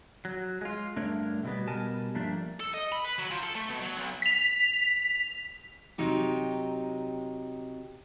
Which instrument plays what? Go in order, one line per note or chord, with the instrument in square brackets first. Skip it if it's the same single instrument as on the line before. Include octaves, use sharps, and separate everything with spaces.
[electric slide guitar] F#3
G#3 F4
G2 D3 A3 D4 A#4 C#5
B2 D3 E3 F#3 G3 B3
B2 G3 B3 A#4 G#5 A5
G2 F3 A3 A#3 D4
[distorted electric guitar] A4
D#5
B5
B4
F#3
F3
A4
A3
B2
F#3
B1
[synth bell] B6 F7
[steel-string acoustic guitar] C3 F#3 D#4 G4